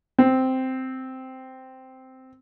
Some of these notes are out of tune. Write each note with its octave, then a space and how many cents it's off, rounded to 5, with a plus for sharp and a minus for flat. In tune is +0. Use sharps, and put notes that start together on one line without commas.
C4 -5